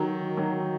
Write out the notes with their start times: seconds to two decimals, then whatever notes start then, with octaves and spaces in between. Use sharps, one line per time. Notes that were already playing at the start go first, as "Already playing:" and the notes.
Already playing: D#3 F#3
0.37 D#3 F#3